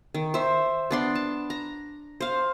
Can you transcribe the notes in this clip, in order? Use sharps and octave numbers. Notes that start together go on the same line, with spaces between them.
D#3
C5 E5
B3 D4 C6
A5
A#5
C5 F5